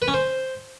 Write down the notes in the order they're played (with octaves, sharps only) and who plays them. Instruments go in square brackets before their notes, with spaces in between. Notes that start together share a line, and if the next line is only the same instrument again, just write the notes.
[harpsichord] B4
C#4
C5